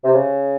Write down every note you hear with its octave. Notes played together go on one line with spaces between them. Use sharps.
C3
C#3